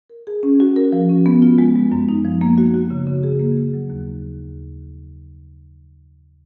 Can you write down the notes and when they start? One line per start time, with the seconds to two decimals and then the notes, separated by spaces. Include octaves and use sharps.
0.10 A#4
0.27 G#4
0.43 C#4
0.60 F#4
0.76 A#4
0.92 F3
1.09 C#4
1.26 B3
1.42 F4
1.58 G#3
1.76 G#3
1.92 F#2
2.09 D#4
2.25 F3
2.41 A#3
2.58 F#4
2.74 F#4
2.90 C#3
3.07 C#3
3.23 G#4
3.39 A#3
3.57 G#4
3.74 F#3
3.90 D#2